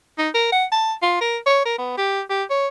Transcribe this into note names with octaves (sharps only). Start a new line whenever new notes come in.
D#4
A#4
F#5
A5
F4
A#4
C#5
A#4
B3
G4
G4
C#5